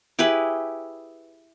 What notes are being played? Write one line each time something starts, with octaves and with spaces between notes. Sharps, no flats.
E4 G4 G#4 B4